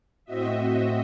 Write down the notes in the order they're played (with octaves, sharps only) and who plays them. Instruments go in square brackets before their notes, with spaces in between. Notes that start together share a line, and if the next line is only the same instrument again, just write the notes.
[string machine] A2 C4 F#4 D#5 E5